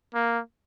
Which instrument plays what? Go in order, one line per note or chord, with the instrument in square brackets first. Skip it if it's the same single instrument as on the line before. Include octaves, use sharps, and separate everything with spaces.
[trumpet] A#3